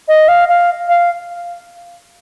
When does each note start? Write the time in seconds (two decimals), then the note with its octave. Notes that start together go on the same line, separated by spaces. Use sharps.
0.08 D#5
0.28 F5
0.49 F5
0.89 F5